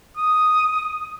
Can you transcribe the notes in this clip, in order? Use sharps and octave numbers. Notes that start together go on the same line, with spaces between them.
D#6